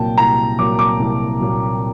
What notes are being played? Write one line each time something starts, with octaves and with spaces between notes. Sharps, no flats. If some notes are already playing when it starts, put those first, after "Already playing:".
Already playing: C2 A#2 F#3 A#3 G5 A5
C2 A#5
A#2 F#3 A#3 D6
D6
C2
A#2 F#3 A#3